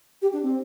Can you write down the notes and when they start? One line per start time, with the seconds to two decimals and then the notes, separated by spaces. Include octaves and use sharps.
0.22 G4
0.33 D4
0.43 C4